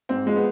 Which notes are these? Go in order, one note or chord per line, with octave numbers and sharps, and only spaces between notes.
G#2 C4
F3 G#3
B3